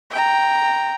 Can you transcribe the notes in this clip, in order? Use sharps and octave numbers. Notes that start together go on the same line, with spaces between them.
G5 A#5